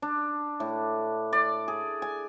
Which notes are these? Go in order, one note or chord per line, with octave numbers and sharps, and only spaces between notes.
D4
A2
D5
G#4
G#5